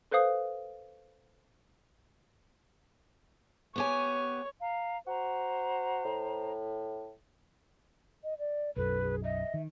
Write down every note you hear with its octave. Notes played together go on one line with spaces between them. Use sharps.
A4 B4 C5 F5 D#6
B3 G4 C#5 G#5
F5 A#5
F#4 C5 A#5
A2
D#5
D5
B1 F#2 A4 B4
G#4
D#5 E5
D#3